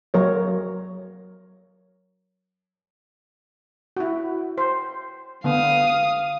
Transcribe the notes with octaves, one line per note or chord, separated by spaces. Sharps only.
F#3 A#4 C#5
E4 F#4
C5
D3 B3 F5 D#6